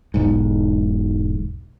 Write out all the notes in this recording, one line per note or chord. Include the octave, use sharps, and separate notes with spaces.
E1 B1 G#2